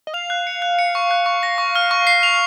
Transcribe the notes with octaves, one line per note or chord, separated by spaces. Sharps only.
D#5
F5 F7
F#6
C#7
F#6
C#7
C#6
F#6
C#6
A#6
C#6
F6
C#6
C7
F7